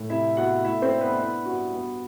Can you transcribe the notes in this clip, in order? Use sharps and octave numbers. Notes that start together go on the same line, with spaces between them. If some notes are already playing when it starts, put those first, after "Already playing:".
Already playing: A2
C3 E4 E5
B3 F#4 F#5
A3 E4 E5
C4 C5
D4
B3 B4
B3 E4 B4
G2 F#4
B3